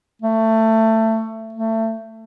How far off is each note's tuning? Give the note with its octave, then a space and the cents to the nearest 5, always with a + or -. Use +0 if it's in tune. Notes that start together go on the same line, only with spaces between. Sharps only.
A3 +20
A3 +25